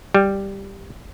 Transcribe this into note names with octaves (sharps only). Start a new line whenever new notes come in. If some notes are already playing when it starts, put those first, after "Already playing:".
G3